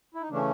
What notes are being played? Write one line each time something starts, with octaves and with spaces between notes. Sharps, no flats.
E4
D#4
C#3 E3 A3 C#4 D4